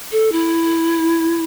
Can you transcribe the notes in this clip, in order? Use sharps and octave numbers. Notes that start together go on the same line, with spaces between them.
A4
E4